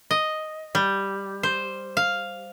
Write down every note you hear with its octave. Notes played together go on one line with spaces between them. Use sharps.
D#5
G3
C5
F5